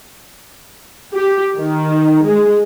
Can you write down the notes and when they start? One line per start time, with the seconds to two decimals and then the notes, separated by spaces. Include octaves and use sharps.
1.14 G4
1.58 D#3
2.25 G#3